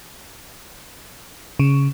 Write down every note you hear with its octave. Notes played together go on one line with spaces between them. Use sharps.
C#3